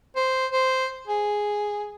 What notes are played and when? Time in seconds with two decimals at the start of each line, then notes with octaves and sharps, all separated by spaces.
0.16 C5
0.52 C5
1.07 G#4